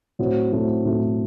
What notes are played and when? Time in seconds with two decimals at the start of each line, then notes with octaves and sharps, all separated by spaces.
0.19 A2 F#3 A3 C4 E4
0.52 A2 F#3 A3 C4 E4
0.85 A2 F#3 A3 C4 E4